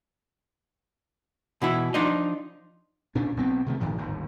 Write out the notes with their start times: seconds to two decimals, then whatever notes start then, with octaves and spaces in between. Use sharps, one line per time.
1.62 B2 E3 E4
1.94 F3 D4 D#4 D#5
3.15 A#2 C#4 D4
3.37 B1 B3 C4
3.66 C3 D#3 A3
3.80 G1 A2 D#3 F3
3.97 G1 D#2 G#2